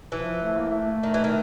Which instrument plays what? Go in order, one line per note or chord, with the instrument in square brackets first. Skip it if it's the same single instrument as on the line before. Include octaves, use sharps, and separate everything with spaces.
[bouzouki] E3 [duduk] F3
[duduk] A3
A#3
A3
[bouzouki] D#3
E3
D#3